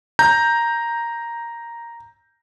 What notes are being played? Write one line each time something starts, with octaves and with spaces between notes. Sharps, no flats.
A#5 G6